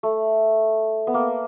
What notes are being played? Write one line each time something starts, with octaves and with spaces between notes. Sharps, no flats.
A3
B3
A#3